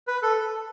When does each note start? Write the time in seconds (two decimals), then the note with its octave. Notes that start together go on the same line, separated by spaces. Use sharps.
0.07 B4
0.22 A4